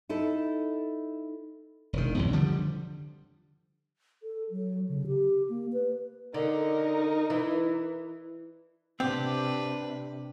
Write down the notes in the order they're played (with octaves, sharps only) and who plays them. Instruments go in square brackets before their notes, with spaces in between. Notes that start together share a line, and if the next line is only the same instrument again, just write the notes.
[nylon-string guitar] D#4 E4 A4
[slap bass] E1 D#3
B1 F2 G#2
D3 F3 G3
[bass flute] A4
F#3
C#3
G4
A#3
B4
[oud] D3 [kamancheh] D#4 A#4
[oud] E3
[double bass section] C3 [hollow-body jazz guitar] C4 [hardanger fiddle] D4 B4 [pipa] G4